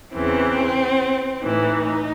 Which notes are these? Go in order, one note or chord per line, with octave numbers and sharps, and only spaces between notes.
E2 C#3 E3 C4
A2 E3 D#4